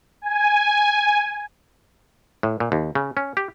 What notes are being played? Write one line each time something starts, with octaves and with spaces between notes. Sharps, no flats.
G#5
A2
A#2
D#2
C#3
C#4
G4